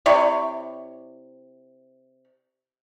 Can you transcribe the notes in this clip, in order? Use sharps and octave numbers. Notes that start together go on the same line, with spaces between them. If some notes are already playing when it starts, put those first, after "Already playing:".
C3 E4 C#5 D5